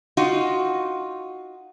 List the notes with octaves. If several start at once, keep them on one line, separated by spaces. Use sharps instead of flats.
D#4 F4 F#4